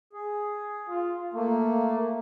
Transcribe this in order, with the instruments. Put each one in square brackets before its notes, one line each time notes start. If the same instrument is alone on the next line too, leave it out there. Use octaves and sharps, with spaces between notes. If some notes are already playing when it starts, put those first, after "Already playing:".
[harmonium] G#4
[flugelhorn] F4
[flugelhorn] A3 [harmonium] A#3